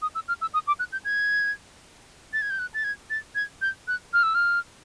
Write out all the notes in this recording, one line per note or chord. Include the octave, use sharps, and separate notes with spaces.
D#6
E6
F6
E6
D#6
D6
F#6
G6
G#6
A6
G#6
G6
F#6
A6
G#6
A6
G#6
G6
F#6
F6
E6
F6